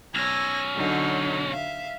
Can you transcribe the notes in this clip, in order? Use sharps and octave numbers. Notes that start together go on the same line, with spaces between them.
B1 C#4 E6 G#6 A#6
D3 F#3 D#4
E5 F5